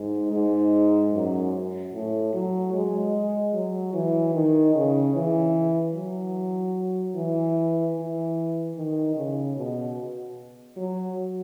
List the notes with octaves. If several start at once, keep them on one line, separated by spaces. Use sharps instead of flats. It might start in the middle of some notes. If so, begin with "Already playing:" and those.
Already playing: G#2
G#2
F#2
A2
F#3
G#3
F#3
E3
D#3
C#3
E3
F#3
E3
E3
D#3
C#3
B2
F#3